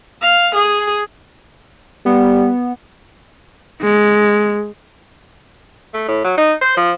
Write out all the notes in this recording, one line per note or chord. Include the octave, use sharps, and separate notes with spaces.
F5
G#4
G3 B3
G#3
A3
A2
F#3
D#4
C5
F3